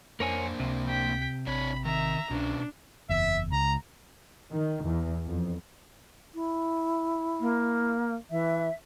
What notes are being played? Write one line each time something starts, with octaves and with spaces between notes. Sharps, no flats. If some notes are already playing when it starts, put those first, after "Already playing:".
F2 A#3 D4 A#4 C5 C#5 G#5
C#2 C3
G5 B6
A1 D4 C#5 B5
D#3 E5 A#5
C2 B2 C#4 D4
F#1 E2 E5
C#2 A#5
D#3
E2
F2
E4
A#3
E3 E5